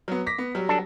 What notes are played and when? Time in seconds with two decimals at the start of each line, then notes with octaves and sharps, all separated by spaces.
0.08 F#3 B3
0.26 D6 A#6 B6
0.38 B3
0.55 F#3 G3
0.69 D4 A4